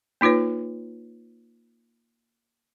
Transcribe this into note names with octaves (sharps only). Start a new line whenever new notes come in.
A#3 D#4 F4 B4 C#5